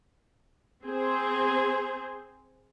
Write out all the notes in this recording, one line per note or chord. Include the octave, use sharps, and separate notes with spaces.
C4 G#4 C5